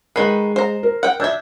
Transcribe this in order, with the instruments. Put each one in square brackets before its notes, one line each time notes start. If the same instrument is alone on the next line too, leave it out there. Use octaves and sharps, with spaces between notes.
[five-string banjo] D#3 B4 [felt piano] G#3 C7
[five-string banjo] C5 A#5
[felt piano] A#4
[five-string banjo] F#5 G5
[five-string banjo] D4 E5 [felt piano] E6 G6 G#6